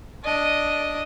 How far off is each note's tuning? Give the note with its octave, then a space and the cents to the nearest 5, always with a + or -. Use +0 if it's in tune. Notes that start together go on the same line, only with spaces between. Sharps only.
D4 +0 D#5 +0